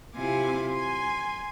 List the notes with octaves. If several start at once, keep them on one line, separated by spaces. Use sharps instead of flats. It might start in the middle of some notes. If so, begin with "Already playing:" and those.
C3 E4 F4 G#5 C6 D6
G#5 C6